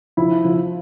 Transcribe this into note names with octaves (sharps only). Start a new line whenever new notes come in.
F3 E4
F3